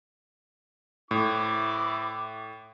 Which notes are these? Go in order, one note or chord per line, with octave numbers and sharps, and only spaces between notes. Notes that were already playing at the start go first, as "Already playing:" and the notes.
A2 E4 D6